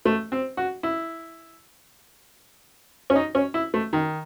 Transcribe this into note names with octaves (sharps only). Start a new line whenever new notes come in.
A3
C4
F#4
E4
C#4
D#4
C#4
E4
A3
D#3